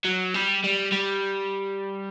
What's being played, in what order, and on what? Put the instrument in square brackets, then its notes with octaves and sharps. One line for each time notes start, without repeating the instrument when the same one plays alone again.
[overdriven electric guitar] F#3
G3
G3
G3